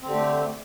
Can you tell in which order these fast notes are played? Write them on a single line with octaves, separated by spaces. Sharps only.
C4 D3 G4 A3